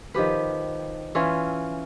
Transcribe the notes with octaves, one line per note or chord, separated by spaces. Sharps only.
D#3 F3 G4 B4
E3 C#4 F4 E5